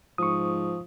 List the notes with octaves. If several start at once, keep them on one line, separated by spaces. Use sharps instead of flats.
G#2 F3 C#6 D#6